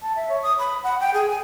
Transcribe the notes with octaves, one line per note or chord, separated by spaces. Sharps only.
A5
E5
C#5
D#6
B5
F#5
G5
G#4
G#5